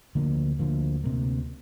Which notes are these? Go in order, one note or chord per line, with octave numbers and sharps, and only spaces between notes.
D2 D3 F3 A#3
D2 D3 F3 A#3
D2 C3 G3 A#3